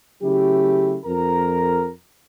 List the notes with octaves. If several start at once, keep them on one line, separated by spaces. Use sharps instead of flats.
C#3 F#3 A3 C#4 E4 G4
F2 A#4 A#5